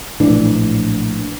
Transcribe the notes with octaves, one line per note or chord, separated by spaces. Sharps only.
A#1 A2 E3 D4